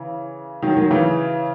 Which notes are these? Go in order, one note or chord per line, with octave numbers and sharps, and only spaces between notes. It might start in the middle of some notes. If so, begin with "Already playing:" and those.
Already playing: C#3 E3
D#3 F#3
D#3 F#3
C#3 E3